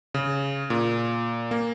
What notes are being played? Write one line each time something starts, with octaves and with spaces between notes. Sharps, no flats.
C#3
A#2
A#3